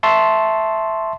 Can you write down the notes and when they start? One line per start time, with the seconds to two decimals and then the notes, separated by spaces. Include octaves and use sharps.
0.03 E5 A5 C6 C#6